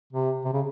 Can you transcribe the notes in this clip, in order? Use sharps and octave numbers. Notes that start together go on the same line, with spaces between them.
C3
C3
C#3